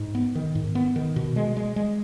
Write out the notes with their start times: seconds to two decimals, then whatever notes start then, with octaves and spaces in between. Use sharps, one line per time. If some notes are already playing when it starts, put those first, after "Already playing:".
Already playing: G#2
0.15 B3
0.35 D#3
0.55 G#2
0.75 B3
0.96 D#3
1.16 B2
1.36 G#3
1.57 G#3
1.76 G#3